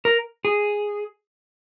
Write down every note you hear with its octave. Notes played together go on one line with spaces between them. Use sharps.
A#4
G#4